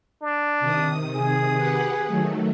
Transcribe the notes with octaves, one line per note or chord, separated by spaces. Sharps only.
D4
C3 D#3 D#6
G#4
G4 B4 F#5
D#3 F#3 A3